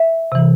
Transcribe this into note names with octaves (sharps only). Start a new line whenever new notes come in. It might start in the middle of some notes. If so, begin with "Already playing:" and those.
Already playing: E5
C3 E3